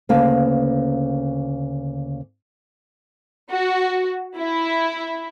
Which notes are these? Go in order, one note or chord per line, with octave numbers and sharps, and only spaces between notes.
D2 C#3 A#3 B4 F5 A5
F#4
E4